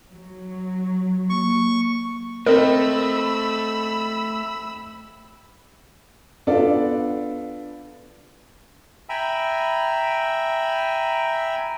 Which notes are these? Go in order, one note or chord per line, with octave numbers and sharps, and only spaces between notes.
F#3
A#3 C#6
A3 C4 A#4 D#5 B5 E6
B3 D4 F4 A4 D5
E5 G5 G#5 A#5 B5 E6